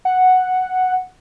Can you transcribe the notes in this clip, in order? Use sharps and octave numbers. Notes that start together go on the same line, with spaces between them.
F#5